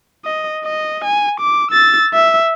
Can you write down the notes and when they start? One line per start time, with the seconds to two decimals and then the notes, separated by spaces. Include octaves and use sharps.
0.25 D#5
0.65 D#5
1.04 G#5
1.40 D6
1.71 E6 A6
2.14 E5